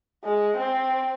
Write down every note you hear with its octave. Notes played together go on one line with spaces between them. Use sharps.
G#3
C4